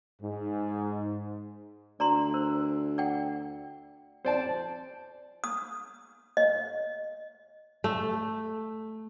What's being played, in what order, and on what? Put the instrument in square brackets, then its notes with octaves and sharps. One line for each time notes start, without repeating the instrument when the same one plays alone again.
[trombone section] G#2
[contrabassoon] D2 [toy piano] D5 A#5 C6
[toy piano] A#4 C5
D5 F#5 G5
[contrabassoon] F2 [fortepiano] C5 D5 A5
[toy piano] D#6
D#5
[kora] A3